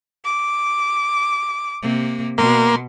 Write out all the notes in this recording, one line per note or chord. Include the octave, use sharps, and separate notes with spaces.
D6
C3 A#3
B2 A#3 C6